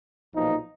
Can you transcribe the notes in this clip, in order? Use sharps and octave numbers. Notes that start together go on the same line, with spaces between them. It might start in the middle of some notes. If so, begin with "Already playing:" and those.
B1 A#2 F3 D#4